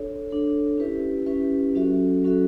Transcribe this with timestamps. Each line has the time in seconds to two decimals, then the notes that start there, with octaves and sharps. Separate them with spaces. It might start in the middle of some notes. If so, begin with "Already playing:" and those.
Already playing: D4 A4 C#5
0.29 D4 A4 C#5
0.77 C#4 E4 G4 B4 E5
1.26 C#4 E4 G4 B4 E5
1.75 F#3 C#4 F#4 A4 E5
2.23 F#3 C#4 F#4 A4 E5